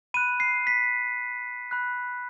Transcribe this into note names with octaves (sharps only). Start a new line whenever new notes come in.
B5 F#6 D#7
C7
B6
B5 F#6